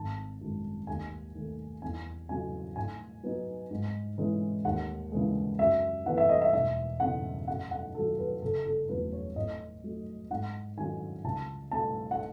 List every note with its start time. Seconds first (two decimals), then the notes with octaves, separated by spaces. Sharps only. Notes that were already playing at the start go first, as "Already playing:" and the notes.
Already playing: G#1 A5
0.41 F#2 D#3 G#3
0.87 D#2 G#5
1.35 D#3 A3
1.82 E2 G#5
2.29 C#3 F#3 G#5
2.76 A2 G#5
3.23 F#3 B3 D#4
3.71 G#2
4.18 E3 G#3 C#4 E4
4.65 D#2 F#5
5.12 C#3 E3 G#3
5.59 F#2 E5
6.06 E3 B3 D#4 F#5
6.18 E5
6.29 D#5
6.42 E5
6.53 E1 E5
7.00 E2 C#3 F#5
7.47 F#2 F#5
7.71 F#5
7.94 D#3 F#3 A4
8.18 B4
8.42 F#1 A4
8.66 A4
8.89 E2 C#3 F#3 A3 B4
9.13 C#5
9.36 A2 D#5
9.84 F#3 A3
10.30 G#2 F#5
10.77 D#3 F#3 C#4 G#5
11.24 C#2 A5
11.72 B2 A3 A5
12.11 F#5